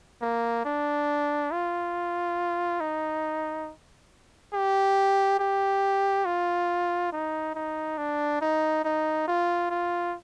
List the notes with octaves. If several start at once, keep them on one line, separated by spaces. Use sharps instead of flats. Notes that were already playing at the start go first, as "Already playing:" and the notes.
A#3
D4
F4
D#4
G4
G4
F4
D#4
D#4
D4
D#4
D#4
F4
F4